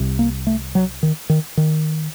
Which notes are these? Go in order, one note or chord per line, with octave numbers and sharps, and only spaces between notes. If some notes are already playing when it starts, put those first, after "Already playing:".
Already playing: C2 C3
A#3
A3
F#3
D#3
D#3
D#3